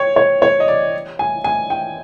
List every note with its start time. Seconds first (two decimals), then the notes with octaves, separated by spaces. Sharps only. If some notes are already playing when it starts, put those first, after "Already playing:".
Already playing: C#5 G5
0.16 C#5
0.42 C#5
0.60 D#5
0.68 D5
1.19 G#5
1.44 G#5
1.70 G5